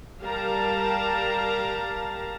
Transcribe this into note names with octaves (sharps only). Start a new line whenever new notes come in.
G3 G4 A#4 F5 A5 A#5